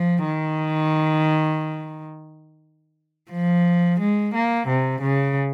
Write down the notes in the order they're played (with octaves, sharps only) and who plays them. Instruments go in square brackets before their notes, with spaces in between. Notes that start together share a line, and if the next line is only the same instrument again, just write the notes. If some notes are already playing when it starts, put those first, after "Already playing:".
Already playing: [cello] F3
D#3
F3
G#3
A#3
C3
C#3